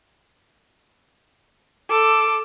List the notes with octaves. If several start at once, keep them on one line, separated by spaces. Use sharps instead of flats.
A4 D6